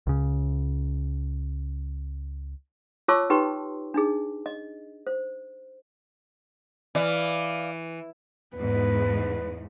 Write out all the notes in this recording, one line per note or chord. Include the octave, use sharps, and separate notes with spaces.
C#2 C#3
F4 C#5 A5 C#6 D6 E6
D#4 G4 B4 G5 C6 C#6
D4 D#4 G#4
D#5
C5
E3 D5 F5
E2 G#2 B4